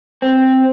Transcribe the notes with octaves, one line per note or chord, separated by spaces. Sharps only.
C4